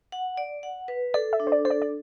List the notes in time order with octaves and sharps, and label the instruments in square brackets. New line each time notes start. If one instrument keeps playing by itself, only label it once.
[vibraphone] F#5
D5
F#5
B4
[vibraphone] A4 [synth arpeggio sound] D5
[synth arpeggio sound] E5
[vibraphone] D4
[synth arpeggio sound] C5
D5
[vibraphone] A4 [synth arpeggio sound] C5
[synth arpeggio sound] D5
D5